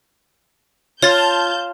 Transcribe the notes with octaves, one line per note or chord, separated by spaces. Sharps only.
F4 C#5 A5 G6 A6